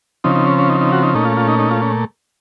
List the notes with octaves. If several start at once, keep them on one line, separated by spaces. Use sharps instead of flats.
C#3 F3 C4 D#4
D#4
C#4
C#4
D#4
D#4
F#4
D#4
A#2 A3 C#4 D#4
F4
F4
D#4
D#4
F4
C#4